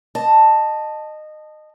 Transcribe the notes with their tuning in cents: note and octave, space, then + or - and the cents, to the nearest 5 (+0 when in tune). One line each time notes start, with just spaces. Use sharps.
D#5 -20 A5 +0